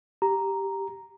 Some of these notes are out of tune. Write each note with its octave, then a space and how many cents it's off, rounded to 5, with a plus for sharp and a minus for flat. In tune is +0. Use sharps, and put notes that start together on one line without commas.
G4 +0 A#5 +0